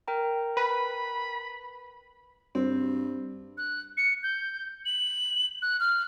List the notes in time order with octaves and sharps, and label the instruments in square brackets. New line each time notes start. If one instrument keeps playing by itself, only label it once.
[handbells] A#4 G5 A#5
[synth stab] B4 [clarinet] B5
[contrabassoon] G2 [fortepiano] C4
[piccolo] F#6
C#7
G6
F#7
F#6
F6